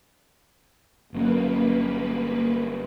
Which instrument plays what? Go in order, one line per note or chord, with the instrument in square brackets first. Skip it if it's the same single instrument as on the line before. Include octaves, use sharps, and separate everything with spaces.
[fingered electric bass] G1 F#3 C#4 [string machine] A#3 B4